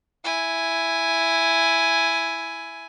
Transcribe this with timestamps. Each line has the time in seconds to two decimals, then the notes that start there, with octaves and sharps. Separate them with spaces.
0.24 E4 G#5